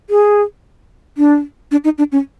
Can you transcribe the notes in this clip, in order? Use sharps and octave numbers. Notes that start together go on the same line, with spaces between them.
G#4
D4
D4
D#4
D4
C#4